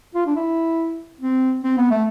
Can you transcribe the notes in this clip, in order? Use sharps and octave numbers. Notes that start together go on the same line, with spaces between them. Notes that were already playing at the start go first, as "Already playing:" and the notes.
F4
D4
E4
C4
C4
B3
A3